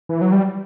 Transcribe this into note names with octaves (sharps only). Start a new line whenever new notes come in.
E3
F#3
G3